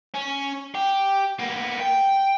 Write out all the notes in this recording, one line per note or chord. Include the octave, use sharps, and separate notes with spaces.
C#4
G4
A#3 B3
G5